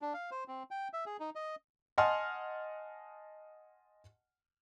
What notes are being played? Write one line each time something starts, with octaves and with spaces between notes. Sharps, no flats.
D4
F5
C5
C4
G5
E5
G#4
D#4
D#5
D#5 F#5 G#5 A5 C6 F6